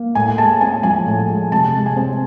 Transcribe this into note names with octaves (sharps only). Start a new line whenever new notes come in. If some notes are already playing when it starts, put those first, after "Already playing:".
Already playing: A#3
A2 G#5
G#3 A5
C4 G#5
F3 G#5
A2
G#3
C3 A5
G#3
G#5
C4